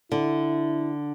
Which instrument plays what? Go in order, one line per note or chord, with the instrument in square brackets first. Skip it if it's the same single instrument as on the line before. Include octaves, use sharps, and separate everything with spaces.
[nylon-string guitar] D3 [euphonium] E4